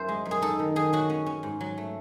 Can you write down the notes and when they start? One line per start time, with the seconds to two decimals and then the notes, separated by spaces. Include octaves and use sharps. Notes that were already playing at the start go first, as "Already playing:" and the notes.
Already playing: F#2 E4 C5
0.08 G#3
0.25 F#2
0.31 G#4
0.42 D#4 A4
0.59 D#3
0.76 D#3 G#4
0.93 F#3 F#4
1.10 C#4
1.26 C#4
1.43 G#2
1.61 F#3
1.78 A3